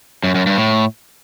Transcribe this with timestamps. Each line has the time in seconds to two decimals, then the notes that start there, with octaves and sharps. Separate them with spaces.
0.24 F#2
0.35 F#2
0.46 G2
0.58 A2